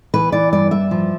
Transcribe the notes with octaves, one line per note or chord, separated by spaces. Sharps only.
E3 B4
E3 D5
G2 D5
G2 E5
F3